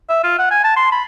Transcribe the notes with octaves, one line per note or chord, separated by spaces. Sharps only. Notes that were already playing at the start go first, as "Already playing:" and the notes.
E5
F4
F#5
G#5
A5
C6
B5